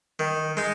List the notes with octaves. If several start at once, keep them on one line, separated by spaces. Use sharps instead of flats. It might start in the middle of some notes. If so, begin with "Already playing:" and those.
D#3
G#3 D#4